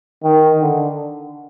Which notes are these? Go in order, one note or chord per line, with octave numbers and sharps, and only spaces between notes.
D#3
D3